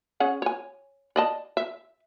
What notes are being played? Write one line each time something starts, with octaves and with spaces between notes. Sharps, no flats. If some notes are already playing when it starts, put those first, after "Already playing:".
C#4 G#4 F#5
C#5 G#5
D5 D#5 A5
E5